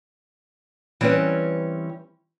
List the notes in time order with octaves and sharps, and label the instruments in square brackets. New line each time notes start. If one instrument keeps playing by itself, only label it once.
[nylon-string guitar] E3 G3 C4 C#4 B4